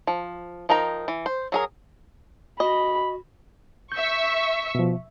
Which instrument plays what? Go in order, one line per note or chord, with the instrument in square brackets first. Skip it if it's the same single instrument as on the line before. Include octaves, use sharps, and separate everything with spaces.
[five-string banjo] F3
F3 D#4 A#4 G5 A#5
E3
C5
F#3 G#4 A#4
[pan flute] F#4 [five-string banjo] D#5 [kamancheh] B5
[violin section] E5 C#6 [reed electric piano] G6
[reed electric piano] B2 F3